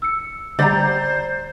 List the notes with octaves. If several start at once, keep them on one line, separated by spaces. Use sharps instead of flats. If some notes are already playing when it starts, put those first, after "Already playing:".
E6 C#7
D3 G3 C5 D5 A#5 G6